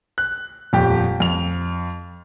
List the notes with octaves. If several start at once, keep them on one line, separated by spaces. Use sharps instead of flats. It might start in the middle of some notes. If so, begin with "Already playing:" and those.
F#6
D#1 F2 G4
F2 F7